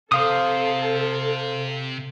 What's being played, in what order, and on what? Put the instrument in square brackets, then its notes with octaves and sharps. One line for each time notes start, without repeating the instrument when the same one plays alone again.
[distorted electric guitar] C3 [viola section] A4 [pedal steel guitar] C5 F5 D#6